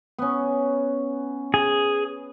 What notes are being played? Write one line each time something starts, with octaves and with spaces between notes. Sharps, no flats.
B3 C#4
G#4